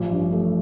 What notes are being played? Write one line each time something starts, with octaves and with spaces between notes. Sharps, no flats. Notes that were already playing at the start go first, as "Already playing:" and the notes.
Already playing: A1 F3
G2
A3